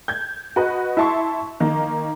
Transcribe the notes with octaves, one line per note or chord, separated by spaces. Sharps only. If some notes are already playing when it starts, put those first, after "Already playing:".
G6 G#6
F#4 B4 D#5
E4 E5 A5 C6 C#6
D#3 A#3